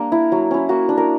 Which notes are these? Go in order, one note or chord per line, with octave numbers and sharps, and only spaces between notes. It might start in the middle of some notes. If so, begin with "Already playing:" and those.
Already playing: G3 A#3 D4 A#4
E4
F#3
C#4 E4
A#3 F#4
D4
A#4